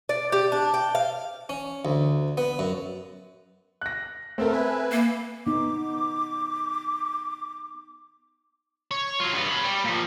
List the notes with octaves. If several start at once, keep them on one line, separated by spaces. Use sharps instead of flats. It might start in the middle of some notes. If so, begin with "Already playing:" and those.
D5
G4
D4
G5
F5
C#4
D2
B3
F#2
F#6 A#6
A3 B3 C4 A4 A#4
B4 E5 G#5
A#3
B3 D#4 D6
C#5
F#3 F4
G2 B3
C#5 B5
G3
A#2 F3